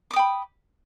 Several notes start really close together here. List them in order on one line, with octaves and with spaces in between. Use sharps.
D6 D#6 G5 B5